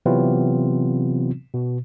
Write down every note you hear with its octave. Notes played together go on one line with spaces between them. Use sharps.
C3 E3 F#3 B3 C4 F4
B2